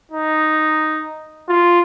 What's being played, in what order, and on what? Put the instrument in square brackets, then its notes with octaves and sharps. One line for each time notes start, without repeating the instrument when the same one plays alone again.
[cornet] D#4
F4